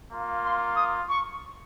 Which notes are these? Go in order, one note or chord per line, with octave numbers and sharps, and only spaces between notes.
A#3 F4
C6
D#6
C#6